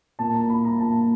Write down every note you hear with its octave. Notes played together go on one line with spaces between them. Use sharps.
A#2 A5
A#5
A#2 B5
A#5
A#2 A5